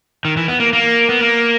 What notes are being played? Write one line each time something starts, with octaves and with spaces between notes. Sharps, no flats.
D#3
E3
B3
A#3
A#3
B3
A#3